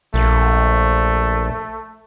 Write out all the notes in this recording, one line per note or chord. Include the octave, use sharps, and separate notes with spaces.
A#1 A3